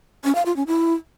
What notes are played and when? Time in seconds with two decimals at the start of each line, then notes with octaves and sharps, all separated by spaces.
0.24 C#4
0.35 F5
0.46 F4
0.56 C#4
0.67 E4